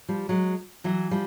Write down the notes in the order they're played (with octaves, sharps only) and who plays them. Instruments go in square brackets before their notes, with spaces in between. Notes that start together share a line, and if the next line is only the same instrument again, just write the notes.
[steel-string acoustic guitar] F3 G3
F#3 G#3
E3 F#3
F3 G3